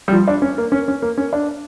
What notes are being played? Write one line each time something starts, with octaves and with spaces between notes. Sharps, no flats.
G3
F3
D4
C#4
A#3
C#4
C#4
A#3
C#4
D4